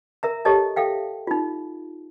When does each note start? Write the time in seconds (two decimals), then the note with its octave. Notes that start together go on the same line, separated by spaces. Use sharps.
0.23 A#4 E5 A#5
0.45 G4 A4 C#5 D#5 A5
0.76 A4 E5 F5 G5
1.27 D#4 F4